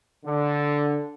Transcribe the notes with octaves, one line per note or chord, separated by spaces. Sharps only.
D3